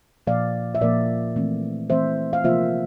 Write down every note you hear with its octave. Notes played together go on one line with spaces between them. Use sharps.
A#2 F3 A#3 D5 F5
E5
A#2 F3 A#3 A#4 D5
E3 A3 C4
E3 A3 C4 C5 E5
F5
C3 F3 A#3 F4 C5 E5